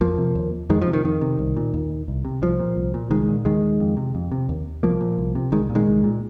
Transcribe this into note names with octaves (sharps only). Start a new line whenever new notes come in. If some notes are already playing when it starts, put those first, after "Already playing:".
F2 F3 A#3
C3
D#2
F2 D#3 G#3
F3
C3
D#3
F2 D#3
C3
C2
A#2
D#2
C2
C3
C2 F3
A#2
C2
A#2
C2 D#3 G#3
A#2
D#2 D#3 G#3
F2
C3
F2
C3
D#2
C2 F3 A#3
A#2
C2
C3
C2 D#3 G#3
A#2
D#3 G#3
C2
A#2